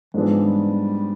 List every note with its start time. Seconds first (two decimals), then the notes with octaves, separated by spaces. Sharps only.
0.14 G#2 E3 F3 G#3 B3 D4
0.46 G3